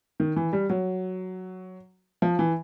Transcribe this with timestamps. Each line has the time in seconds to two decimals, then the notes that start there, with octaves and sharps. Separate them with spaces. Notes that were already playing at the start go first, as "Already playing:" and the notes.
0.20 D#3
0.36 E3
0.53 G3
0.70 F#3
2.22 F3
2.39 E3